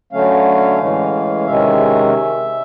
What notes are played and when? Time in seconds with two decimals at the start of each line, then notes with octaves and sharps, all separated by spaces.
0.12 D3 F#3 A3 C#4 F5
0.80 A2 E3 G#3 C#4
1.46 C3 D#3 G#3 C#4 E5